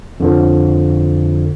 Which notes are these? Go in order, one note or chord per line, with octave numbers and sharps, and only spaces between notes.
F2 D3 F3